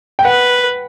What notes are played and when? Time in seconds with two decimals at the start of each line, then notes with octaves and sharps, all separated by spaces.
0.19 G5
0.25 B4 F#5